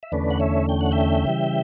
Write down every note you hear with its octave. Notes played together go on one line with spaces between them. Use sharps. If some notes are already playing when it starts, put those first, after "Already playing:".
E5
E2 D3 A3 C#4 B4 D5
F#5
C#5 E5
G5
F#5
E5 G5
C#3 E3 G3